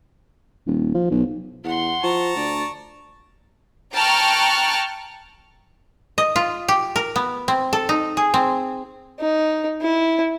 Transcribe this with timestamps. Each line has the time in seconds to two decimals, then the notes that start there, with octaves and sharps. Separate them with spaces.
0.67 D#1
0.95 F3
1.11 B1
1.64 E2 F#5 C6
2.04 F3 A5 A#5 C#6
2.36 D2 D5
3.94 G5 A5 A#5 C#6 F6 F#6
6.18 D#5
6.36 F4
6.68 G4
6.96 A#4
7.16 B3
7.48 C4
7.73 A4
7.89 D#4
8.17 G#4
8.34 C4
9.20 D#4
9.81 E4